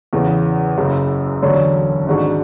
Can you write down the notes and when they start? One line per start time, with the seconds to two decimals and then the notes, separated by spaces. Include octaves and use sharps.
0.13 E2 C#3 E3
0.77 F#1 F#2 C#3
1.43 E1 D2 D3 F#3 C#4
2.07 G#1 G#2 G#3 D4 F#4